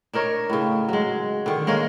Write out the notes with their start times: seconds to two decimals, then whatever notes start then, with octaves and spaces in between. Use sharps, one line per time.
0.13 D4 D#4 A#4 C#5
0.50 A2 C#3
0.89 F#3 G#3
1.46 D3 D#3
1.67 G#3 A#3 C#5 F5